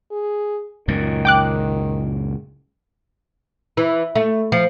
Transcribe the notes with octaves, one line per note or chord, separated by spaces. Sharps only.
G#4
C#2 F#2 A#2 D#3
G5 D6 F#6
E3
A3
F3